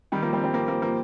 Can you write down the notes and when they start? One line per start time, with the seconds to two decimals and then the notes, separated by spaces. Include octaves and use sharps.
0.12 D#3 G3
0.22 F3 A#3
0.33 G3 C4
0.44 G3 C4
0.54 F3 A#3
0.68 F3 A#3
0.82 F3 A#3